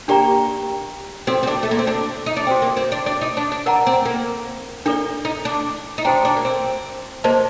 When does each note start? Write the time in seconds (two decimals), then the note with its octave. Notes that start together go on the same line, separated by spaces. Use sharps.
0.08 A#3 D4 G4 D5 G5 A#5
1.27 C4 F#4 A4 D5
1.43 C4
1.47 D4
1.63 A3
1.71 A#3
1.79 C4
1.87 D4
2.26 D#4
2.37 D4
2.47 C4 F#4 C5 G5
2.62 A#3
2.77 C4
2.92 D4
3.06 D4
3.21 D#4
3.37 D4
3.52 D4
3.66 D4 A#4 F#5 A#5
3.87 C4
4.05 A#3
4.86 A#3 D4 A4 D5
5.25 D#4
5.45 D4
5.98 D#4
6.04 D4 F#4 C5 G5 A#5
6.25 D4
6.36 A#3
6.45 C4
7.24 A#3 F#4 C5 D#5 A5